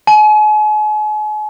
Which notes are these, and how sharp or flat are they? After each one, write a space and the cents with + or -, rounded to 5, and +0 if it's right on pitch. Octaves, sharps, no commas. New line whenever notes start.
G#5 +40